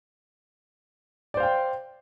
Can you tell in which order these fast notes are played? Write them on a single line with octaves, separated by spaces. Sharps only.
D5 C5 F5 G5